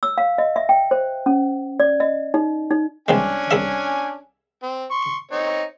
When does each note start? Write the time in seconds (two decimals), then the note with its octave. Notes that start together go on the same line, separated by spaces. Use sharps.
0.03 E6
0.18 F5
0.38 D#5
0.56 E5
0.69 G5
0.91 C5
1.26 C#4
1.80 D5
2.00 D#5
2.34 D#4
2.71 D#4
3.08 C2 C3 G#3 C#4 D4 G#5
3.51 C2 G#4 E5
4.62 C4
4.91 C6 C#6
5.31 C4 D#4 C#5